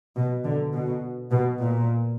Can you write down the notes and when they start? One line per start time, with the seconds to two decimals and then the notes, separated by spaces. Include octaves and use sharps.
0.16 B2
0.45 D3
0.74 B2
1.32 B2
1.60 A#2